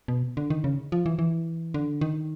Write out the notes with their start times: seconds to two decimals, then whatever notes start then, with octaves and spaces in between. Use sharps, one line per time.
0.08 B2
0.37 D3
0.50 D#3
0.64 C#3
0.92 F3
1.06 E3
1.19 E3
1.74 D3
2.01 D#3